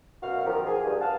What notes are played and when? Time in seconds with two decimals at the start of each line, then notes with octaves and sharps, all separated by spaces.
0.23 F#2 B2 F#4 F5
0.46 D#3 F3 G4 A#4
0.66 G#4
0.84 G2
1.00 F5 F#5 A5